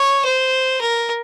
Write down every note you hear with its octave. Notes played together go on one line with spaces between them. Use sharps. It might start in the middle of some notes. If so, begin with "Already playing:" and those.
Already playing: C#5
C5
A#4